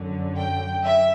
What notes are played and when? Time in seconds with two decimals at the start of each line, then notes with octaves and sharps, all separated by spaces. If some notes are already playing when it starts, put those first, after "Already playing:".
Already playing: F#2 D3 F#3
0.37 G5
0.84 E5